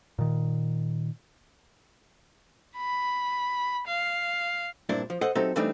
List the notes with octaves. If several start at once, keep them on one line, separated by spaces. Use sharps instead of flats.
A#2 D#3
B5
F5
G2 A#2 C4 D4 E4
F3
A4 C5 D#5 F#5
F#3 C4 D#4 G4 A4 E5
E3 G3 A3 C4 D4 D#4